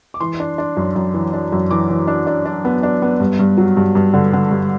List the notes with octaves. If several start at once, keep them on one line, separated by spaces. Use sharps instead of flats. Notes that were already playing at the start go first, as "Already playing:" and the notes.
D6
E3 C6
D4
D4
F#2
F#2
E3
D4
F#2
E3 D6
E3
D4
D4
D4
B3
D4
B3
G2
G2
F#3
G2
G2
D3
D3
G2